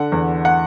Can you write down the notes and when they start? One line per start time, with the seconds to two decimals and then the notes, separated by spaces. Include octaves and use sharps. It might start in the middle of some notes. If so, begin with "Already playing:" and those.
Already playing: D3 F#5
0.12 E2
0.45 F#5